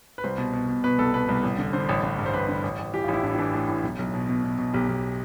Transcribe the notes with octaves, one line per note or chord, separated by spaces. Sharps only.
B4
C2 C5
B2
B2
B2
B2 B4
C2 A4
B2 B4
C2
A1
D3
D3 C5
A1
A1
G2
C5
A1 B4
D3
A1
A1
E3 G4
F4
A1
E4
A2 D4
E4
E3 D4
A2
A2
B1
B1
B2
B2
B2
B2
B1 G4
B1